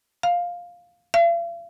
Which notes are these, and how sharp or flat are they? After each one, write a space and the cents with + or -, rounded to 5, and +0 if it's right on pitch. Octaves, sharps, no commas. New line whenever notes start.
F5 +10
F5 -45